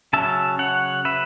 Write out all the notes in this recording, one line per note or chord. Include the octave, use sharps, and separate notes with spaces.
C#3 F#3 C#4 E5 A5
C#5 F#5
B4 E5